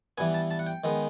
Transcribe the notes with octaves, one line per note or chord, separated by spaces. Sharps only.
E3 G3 B3 G#5
A5
A5
F#5
G5
D#3 G#3 B3